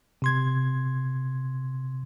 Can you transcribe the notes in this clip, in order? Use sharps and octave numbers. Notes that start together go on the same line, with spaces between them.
C3 C6 G#6